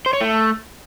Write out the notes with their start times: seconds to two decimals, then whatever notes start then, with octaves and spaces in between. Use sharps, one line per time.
0.06 C5
0.13 C#5
0.21 A3